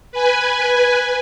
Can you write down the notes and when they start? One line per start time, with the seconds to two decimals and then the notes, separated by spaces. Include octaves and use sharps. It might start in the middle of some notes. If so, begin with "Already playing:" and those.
0.12 B4 G#5